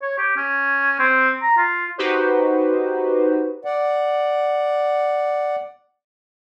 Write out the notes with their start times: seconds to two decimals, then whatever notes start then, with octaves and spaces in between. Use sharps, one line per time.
0.02 C#5
0.18 G4
0.37 C#4
0.99 C4
1.42 A#5
1.58 F4
1.98 D#4 F#4 G4 B4 C5
3.65 D5 F#5